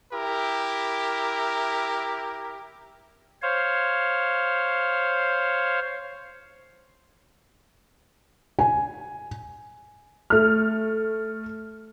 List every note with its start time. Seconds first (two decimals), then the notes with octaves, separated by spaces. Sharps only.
0.13 E4 G4 A#4
3.42 C5 C#5 F5
8.59 G#5
10.30 A3 F6